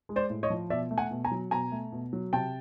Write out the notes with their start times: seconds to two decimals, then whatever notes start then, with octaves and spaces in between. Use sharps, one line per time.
0.09 G#3
0.16 C5 D5
0.30 A2
0.43 C#5 D#5
0.50 F3
0.70 B2 D5 E5
0.91 A3
0.98 F#5 G#5
1.11 B2
1.25 G#5 A#5
1.31 F#3
1.51 B2 G#5 A#5
1.72 A3
1.92 B2
2.13 F#3
2.33 C3 G5 A5